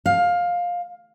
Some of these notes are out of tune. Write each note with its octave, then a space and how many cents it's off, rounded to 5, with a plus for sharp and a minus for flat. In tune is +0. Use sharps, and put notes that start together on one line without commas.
F5 +15